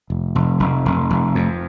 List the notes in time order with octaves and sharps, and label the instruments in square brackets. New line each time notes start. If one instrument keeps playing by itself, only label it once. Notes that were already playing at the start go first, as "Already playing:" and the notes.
[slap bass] F1
F1
F1
F1
F1
F2